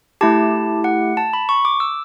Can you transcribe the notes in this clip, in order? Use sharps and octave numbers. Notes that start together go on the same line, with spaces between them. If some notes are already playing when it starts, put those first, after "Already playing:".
A3 E4 G4 A5
F#5
A5
B5
C#6
D6
E6